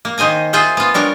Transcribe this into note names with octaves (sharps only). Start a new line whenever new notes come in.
A#3
D#3 C5 D#5 G#5 A#5
F4 G#4 C5 E5 F#5
B3 F4
G3 D4 A#4 C#5